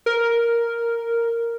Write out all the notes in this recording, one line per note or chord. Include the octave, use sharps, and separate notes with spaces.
A#4